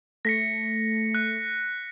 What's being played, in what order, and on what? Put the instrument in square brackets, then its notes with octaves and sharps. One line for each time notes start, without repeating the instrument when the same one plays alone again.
[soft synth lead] A3 [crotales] A#6 B6 C#7
[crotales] F#6